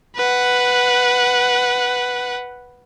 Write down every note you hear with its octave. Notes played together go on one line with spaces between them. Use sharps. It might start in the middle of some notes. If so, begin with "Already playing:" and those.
B4 F#5